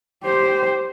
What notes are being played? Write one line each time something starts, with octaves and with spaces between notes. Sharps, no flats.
G4 C5